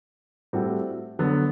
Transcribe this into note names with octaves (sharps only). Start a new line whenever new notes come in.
A2 G3 C4 F#4 A4
D3 F#3 B3